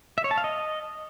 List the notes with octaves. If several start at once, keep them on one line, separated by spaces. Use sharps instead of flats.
E5
C#5
A5
F5
D#5